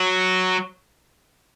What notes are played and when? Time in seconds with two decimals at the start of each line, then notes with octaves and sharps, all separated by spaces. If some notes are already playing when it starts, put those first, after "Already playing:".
Already playing: F#3